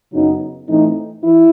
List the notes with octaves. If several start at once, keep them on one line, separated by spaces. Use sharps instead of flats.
F#2 C#3 F#3 B3 D#4
A2 E3 A3 C4 D#4
E3 E4